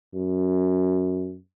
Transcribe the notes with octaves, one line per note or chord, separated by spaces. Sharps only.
F#2